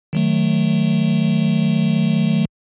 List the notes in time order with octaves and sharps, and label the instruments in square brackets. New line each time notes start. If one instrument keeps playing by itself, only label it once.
[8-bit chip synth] D#3 F#3 A3